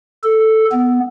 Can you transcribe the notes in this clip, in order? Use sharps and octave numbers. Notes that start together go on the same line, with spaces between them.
A4
B3